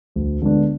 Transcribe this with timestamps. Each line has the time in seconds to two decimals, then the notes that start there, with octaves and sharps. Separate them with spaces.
0.16 D2
0.42 D3 G#3 B3 D4